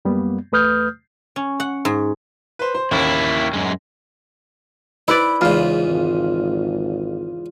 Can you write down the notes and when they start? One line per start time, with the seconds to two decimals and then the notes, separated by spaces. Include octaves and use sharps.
0.05 F#2 G3 A#3 B3
0.52 E2 A3 B4 D#6 F6 G6
1.36 C#4
1.60 F#5
1.85 G#2
2.59 B4 C5
2.74 C5
2.91 A1 D#2 A#3 E4
3.54 F#2 G#3
5.08 E4 B4 C5 D5
5.41 E2 G#2 C#3 F4
5.88 G#1